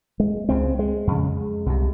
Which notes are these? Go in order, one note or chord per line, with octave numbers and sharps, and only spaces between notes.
G#3
C#2 C#3 C4
G#3
F2 C#3
C2 C3